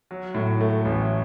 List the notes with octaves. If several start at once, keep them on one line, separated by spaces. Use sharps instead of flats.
F#3
A2
A3
A1